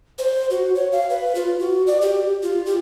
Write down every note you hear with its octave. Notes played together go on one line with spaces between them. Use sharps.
C5
F#4
C#5
F5
B4
F4
F#4
D5
G4
F4
G4